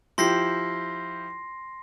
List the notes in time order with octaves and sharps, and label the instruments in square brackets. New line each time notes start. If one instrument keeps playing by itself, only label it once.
[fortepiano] F3 E4 G4 [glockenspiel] C6 A#6 C7